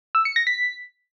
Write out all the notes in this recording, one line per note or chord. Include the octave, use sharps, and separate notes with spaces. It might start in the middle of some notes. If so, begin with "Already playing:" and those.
E6
C#7
A#6
B6